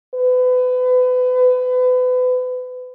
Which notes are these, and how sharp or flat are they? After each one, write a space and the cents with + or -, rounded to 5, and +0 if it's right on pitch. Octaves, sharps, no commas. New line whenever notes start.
B4 +30